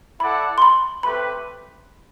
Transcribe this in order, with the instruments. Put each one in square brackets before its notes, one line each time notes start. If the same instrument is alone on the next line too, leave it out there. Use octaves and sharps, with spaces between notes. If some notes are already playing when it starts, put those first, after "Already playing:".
[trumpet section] E4 A4 D5 F#5 [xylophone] B5
[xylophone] C6
B5
[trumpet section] A3 C4 G4 B4 [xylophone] B5